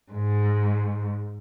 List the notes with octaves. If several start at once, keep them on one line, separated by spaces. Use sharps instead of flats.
G#2